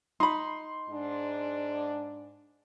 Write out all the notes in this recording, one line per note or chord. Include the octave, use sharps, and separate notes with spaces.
D#4 B5 C6
G#2 D4